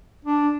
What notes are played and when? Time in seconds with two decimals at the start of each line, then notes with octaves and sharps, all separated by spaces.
0.25 D4